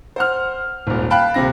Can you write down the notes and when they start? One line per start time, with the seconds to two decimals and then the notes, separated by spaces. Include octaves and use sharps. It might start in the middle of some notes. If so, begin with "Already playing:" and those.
0.16 C5 F#5 F6
0.87 D#1 G#1
1.10 F5 G5 A5 B5 F#6
1.34 D#1 C3 C4 A#6